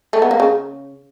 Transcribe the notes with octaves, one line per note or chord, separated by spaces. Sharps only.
A3
B3
A#3
C#3